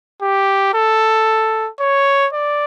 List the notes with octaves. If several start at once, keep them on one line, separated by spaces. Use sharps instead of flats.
G4
A4
C#5
D5